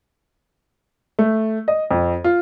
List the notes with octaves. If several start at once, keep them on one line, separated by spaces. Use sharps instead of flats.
A3
D#5
F2
F4